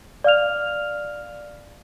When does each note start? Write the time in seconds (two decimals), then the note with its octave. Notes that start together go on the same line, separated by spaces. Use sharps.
0.24 D5 F5 F6 F7